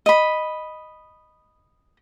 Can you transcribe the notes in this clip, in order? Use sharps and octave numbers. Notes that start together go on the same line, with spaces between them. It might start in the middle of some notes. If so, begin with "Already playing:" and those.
D#5 B5